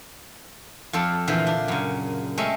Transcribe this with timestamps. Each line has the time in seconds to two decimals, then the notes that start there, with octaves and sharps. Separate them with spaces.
0.93 F2 F4 A4 D5 A5
1.28 A#2 D3 E3 F4 C5
1.47 D4
1.68 F#2 C#3
2.38 G#3 A3 C4 C#4